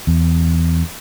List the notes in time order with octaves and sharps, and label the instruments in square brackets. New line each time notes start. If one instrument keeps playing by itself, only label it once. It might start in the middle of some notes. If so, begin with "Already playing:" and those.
[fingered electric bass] E2